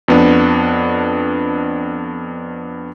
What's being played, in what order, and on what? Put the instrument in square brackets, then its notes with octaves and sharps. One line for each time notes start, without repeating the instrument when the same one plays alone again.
[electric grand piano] F2 B3 D4